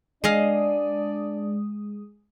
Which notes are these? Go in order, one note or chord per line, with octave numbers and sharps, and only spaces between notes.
G#3 D4 G#4 D5 D#5 F5 D#6